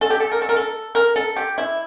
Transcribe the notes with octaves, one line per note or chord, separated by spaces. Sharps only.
A4
G4
A4
A#4
A4
A#4
A4
A#4
A4
G4
E4